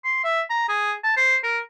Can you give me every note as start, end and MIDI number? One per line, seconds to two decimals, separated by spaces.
0.04 0.19 84
0.24 0.41 76
0.50 0.65 82
0.68 0.93 68
1.04 1.12 81
1.17 1.36 72
1.43 1.59 70